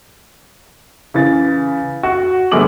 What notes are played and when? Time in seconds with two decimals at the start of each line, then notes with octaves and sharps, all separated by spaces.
1.14 C#3 E3 A6
2.03 F#4
2.51 G1 A3 G#4 D6 F#7